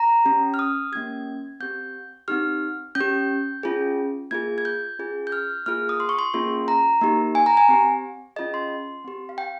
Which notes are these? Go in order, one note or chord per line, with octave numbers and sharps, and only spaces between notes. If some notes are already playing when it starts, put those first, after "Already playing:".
Already playing: A#5
C#4 G4
F6
D#6
A#3 C#4 G4 G#6
C4 G4 G6
C4 D#4 G4 F6
C#4 G6
G4
C#4 F4 G#4
A#3 F4 G#4 G#6
G#6
G6
C#4 F4 G#4
G6
F6
A#3 F4 G#4 F6
D#6
C6
C#6
C6
A#3 C#4 F4 G#4
A#5
A#3 D#4 G4
G#5
A#5
G#5
C4 G4
C#4 F4 G#4 D#5
C6
C4 G4
F5
G5